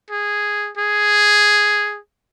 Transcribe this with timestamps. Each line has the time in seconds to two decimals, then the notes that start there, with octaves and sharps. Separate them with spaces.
0.11 G#4
0.78 G#4